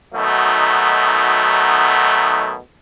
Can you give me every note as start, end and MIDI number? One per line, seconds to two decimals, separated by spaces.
0.14 2.56 47
0.14 2.56 51
0.14 2.56 54
0.14 2.56 57
0.14 2.56 63